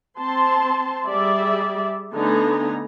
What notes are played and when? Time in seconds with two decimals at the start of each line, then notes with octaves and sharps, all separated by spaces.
0.18 C4 A5 C6
1.06 G3 G#4 D5 E5
2.14 D3 A3 B3 D#4 G#5 A#5